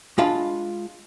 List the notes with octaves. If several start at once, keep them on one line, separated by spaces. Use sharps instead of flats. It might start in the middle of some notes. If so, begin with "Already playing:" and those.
G#3 D4 F4 F5 A5 B5